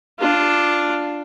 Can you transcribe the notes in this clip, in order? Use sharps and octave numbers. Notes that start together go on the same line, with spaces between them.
D4 F4